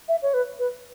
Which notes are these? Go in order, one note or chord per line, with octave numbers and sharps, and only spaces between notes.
E5
C#5
B4
B4